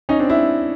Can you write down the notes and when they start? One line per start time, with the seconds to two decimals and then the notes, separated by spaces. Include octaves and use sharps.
0.09 C#4 D#4
0.19 C4 D4
0.29 D4 E4